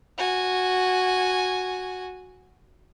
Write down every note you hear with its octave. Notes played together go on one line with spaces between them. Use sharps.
F#4 G#5